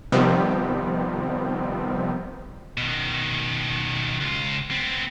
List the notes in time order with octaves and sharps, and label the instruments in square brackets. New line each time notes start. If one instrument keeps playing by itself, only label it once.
[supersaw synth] C3 D#3 F3 G3 B3 C4
[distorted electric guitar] B2 D#3
C#2 F4
B3 C4